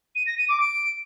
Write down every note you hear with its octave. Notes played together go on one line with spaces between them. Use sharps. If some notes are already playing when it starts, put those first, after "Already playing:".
D#7
A#6
D#7
D6
D7